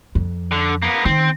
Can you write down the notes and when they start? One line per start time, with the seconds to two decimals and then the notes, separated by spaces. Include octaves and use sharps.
0.15 F2
0.52 D3
0.82 A#3 B3
1.05 D#3 C4